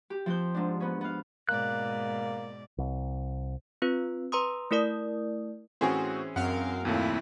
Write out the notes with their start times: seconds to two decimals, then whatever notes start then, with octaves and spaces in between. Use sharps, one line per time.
0.10 G4
0.26 F3 C4 G6
0.55 G#2 D4
0.80 B3 C#4
1.01 B3 F5
1.49 G#2 B2 A#3 D5 F#6
2.78 C2
3.82 C4 F4 B4
4.32 B4 A#5 C6 D#6
4.71 A3 E4 A#4 D5 D#6
5.81 A2 E3 C4 C#4 F#4 G#4
6.36 F#2 C4 A#4 F5 F#5
6.85 D#2 A#2 A3 C4 E4